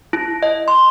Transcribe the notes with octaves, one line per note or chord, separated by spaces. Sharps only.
E4
D#5
C6